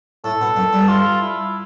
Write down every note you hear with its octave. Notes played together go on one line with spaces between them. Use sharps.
A2 A3 A4
B2 B3
F#2 F#3
G2 G3
F4
E4